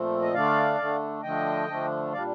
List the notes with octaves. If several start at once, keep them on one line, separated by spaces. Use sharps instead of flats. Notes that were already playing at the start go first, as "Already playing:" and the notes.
Already playing: A#2 F3 A3 C4
D#5
D3 A3 D4 D5 F5
D3 A3 D4
D3 F3 A3 D4 D#5 G5
D3 F3 A3 D4
A#2 G3 D4 D5 F5